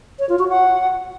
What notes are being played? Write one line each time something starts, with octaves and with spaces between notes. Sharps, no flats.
C#5
F4
F#4
F#5